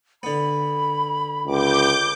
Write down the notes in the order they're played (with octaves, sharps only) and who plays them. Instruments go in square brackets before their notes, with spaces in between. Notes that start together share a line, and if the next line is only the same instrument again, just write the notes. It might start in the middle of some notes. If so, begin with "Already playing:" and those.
[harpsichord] D3 B3 [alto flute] B5
[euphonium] C#2 [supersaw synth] D6 G6